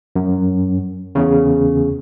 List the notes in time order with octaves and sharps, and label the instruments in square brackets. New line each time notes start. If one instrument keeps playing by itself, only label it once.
[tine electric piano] F#2
E2 C#3